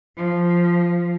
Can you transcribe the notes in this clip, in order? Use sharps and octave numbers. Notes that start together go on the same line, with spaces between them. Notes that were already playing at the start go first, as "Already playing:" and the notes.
F3